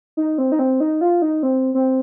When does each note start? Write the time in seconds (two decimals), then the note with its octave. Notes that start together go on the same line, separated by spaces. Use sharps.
0.17 D#4
0.38 C4
0.52 D#4
0.59 C4
0.80 D#4
1.01 F4
1.22 D#4
1.43 C4
1.74 C4